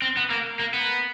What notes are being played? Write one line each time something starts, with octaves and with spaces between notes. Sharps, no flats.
C4
B3
A#3
A#3
B3